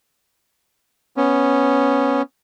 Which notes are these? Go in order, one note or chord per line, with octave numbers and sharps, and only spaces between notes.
B3 C#4